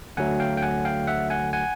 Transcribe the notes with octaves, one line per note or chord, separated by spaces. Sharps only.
D2 D3 F#3 A3 F#5 G#5
F5 G5
G5
F#5 G#5
F5 G5
E5 F#5
F#5 G#5
F#5 G#5